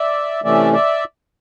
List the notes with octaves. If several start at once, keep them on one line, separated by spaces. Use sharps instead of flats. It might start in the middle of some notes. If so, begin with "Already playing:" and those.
Already playing: D5 E5
C3 E3 A3 C#4 D5 E5
D5 E5